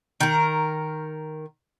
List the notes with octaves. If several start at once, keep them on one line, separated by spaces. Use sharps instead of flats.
D#3 A#4